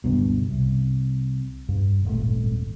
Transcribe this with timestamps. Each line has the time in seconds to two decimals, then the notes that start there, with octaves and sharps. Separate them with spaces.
0.04 F#1 D2 G2 B2
0.51 C2
1.69 G2
2.05 D#1 G#1 A3